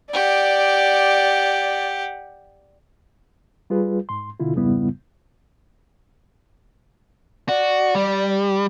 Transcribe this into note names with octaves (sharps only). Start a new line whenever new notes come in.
G4 D5 F#5
G3 F4 G#4 B4
G#2 C6
B2 D3 E4 F4
F2 G#2 C#3 G3 B3 E4
F#4 D5
G3